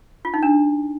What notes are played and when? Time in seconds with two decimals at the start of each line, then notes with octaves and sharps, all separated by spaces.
0.25 F4
0.34 D#4
0.43 D4